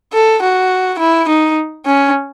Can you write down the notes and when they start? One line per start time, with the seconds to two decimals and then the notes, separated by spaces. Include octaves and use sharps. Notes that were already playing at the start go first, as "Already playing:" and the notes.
0.13 A4
0.42 F#4
0.99 E4
1.28 D#4
1.86 C#4